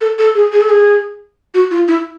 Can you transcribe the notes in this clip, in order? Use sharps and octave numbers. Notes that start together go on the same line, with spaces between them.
A4
A4
G#4
G#4
A4
G#4
F#4
F4
E4